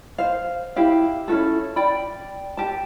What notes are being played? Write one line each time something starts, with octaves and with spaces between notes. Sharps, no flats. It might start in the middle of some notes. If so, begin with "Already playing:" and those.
C5 F5
E4 G4 F5
C#4 E4 F#4 A4
D5 G5 B5
G4 A5